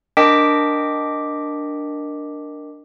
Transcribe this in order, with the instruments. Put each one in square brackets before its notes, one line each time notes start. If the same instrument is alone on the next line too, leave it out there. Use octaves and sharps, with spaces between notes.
[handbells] D4 A#4 D#5 G5 D6 B6